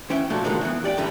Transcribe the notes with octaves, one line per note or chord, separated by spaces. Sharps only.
E3 C#4 E5 F#5 G5
A#2 F3 F#3 A3 C4 D4
C#2 D3 D#3 F#3 G#3 A#3
E3 B3
G4 D5 F#5 G5
F#2 D3 E3 G3